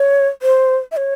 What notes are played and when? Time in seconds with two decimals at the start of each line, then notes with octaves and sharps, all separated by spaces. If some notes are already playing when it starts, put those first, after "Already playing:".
Already playing: C#5
0.42 C5
0.92 E5
0.97 C#5